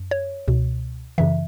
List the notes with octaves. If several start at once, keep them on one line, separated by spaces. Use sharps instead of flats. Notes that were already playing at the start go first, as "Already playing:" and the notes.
Already playing: F#2
C#5
C#2 B2
F#2 C#3 E3 E5